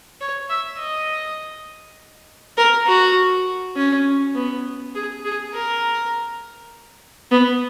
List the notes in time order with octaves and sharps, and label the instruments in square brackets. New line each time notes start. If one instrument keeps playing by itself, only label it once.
[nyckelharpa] C#5
E5
D#5
A#4
F#4
C#4
B3
G#4
G#4
A#4
B3